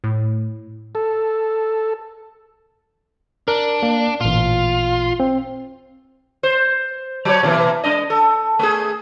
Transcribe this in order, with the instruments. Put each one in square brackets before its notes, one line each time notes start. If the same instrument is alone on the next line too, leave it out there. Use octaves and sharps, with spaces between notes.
[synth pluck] A2
[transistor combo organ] A4
[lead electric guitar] D4 [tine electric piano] A#4
[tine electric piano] A#3
[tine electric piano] A1 A#2 [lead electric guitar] F4
[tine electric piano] C4
[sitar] C5
F#3 F#4 C#5
B2 E3 A#3
G#3 D4 D#5
A4
A3 G#4